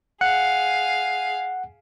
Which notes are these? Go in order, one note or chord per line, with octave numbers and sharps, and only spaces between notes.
G#4 F5 F#5